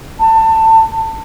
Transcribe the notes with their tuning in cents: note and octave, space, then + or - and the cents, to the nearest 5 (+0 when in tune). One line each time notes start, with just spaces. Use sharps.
A5 +25